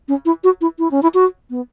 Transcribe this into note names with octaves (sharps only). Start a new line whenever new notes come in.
C#4
E4
F#4
E4
E4
C#4
E4
F#4
B3